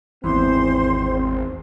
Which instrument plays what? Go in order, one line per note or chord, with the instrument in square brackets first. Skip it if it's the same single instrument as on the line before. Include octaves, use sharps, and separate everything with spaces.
[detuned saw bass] G#1 [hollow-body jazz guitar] E2 E3 [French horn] C4 [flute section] C5 C6